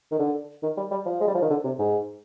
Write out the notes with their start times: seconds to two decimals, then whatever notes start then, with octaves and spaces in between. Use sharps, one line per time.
0.12 D#3
0.19 D3
0.63 D#3
0.77 G3
0.91 G3
1.06 F3
1.21 G#3
1.27 G3
1.35 F3
1.42 D#3
1.50 D3
1.64 C3
1.79 G#2